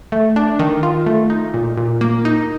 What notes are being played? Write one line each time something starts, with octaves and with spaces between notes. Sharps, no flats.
A3
D4
D#3
F4
A3
D#4
A#2
A#2
A#3
D#4